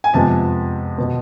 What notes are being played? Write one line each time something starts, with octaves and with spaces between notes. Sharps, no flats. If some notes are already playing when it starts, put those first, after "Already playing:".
G#5
F2 C3 F3 G#3 B3 A5
B2 B3